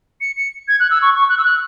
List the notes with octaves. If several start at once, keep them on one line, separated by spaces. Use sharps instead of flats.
C#7
C#7
G#6
F#6
E6
C#6
C#6
F#6
E6
F#6